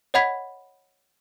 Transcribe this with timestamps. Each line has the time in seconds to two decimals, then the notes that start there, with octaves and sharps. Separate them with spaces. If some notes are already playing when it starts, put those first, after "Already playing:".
0.14 C#5 D#5 F#5 B5 G#6 B6